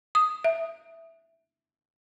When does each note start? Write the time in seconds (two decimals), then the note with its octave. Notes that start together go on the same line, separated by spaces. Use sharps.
0.15 D#6
0.44 E5